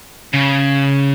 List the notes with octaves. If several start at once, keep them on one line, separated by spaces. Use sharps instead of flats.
C#3